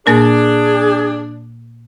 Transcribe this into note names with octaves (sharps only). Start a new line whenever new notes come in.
A#2 A#3 D4 G#4 A#4